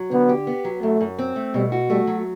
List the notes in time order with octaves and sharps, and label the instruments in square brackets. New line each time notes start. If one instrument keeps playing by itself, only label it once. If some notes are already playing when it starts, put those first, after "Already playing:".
Already playing: [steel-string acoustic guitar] F#3
[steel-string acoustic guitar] D3 [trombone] B3
[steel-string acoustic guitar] G4
B3
F#3
[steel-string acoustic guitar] F#2 [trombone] A3
[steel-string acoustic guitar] F#2
C4
A3
[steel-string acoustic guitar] B2 [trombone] G3
[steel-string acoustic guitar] F#4
[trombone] G3 [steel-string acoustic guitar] A3
[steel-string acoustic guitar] F#3